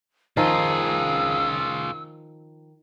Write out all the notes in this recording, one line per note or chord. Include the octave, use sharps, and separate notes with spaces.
D#3 F3 F4 G#4 E6